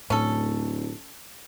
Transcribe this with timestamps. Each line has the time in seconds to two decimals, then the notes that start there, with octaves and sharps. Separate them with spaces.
0.10 D1 A2 C#4 A4